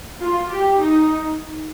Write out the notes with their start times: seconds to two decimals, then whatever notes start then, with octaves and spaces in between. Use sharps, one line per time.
0.19 F4
0.50 G4
0.80 D#4